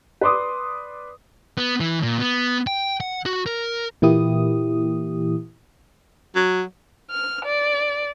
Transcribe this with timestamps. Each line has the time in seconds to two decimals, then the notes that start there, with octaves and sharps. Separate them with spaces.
0.21 B4 D5 C6 D6 D#6
1.57 B3
1.80 E3
2.03 A#2
2.18 B3
2.67 G5
3.00 F#5
3.26 F#4
3.46 A#4
4.02 A#2 E3 A#3 E4 G4 D#6
6.35 F#3
7.09 F6
7.44 D5